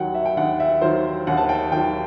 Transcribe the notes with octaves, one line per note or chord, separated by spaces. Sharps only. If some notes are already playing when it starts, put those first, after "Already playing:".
Already playing: D#2 D#3 F#3 F#5 G5
E5
G5
D#2 F#5
E5
D#3 F#3 C5
D#2 F#5
A5
G5
D#3 F#3 G5